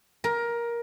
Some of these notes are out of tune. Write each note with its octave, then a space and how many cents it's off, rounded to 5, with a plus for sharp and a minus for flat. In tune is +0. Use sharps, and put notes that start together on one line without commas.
A#4 +15